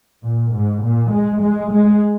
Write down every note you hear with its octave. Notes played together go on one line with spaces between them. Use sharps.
A#2
G#2
A#2
G#3
G#3
G#3